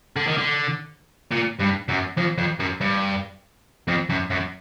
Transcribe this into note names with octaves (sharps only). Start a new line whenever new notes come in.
D3
D#3
D3
A#2
G2
F#2
F2
F2
F#2
G2
F2
F#2
F#2